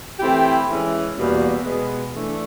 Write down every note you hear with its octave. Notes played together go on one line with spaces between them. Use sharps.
E3 A3 C4 E4 G4
E3 G#3 C#4
E2 B2 G3 A#3
B2 G#3 B3
E3 A3 D4